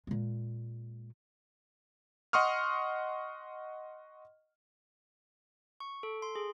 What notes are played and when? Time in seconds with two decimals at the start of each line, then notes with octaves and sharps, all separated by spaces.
0.07 A#2 G#3
2.33 D#5 F#5 C6 C#6 D#6 F6
5.80 C#6
6.03 A4
6.22 C6
6.35 G#4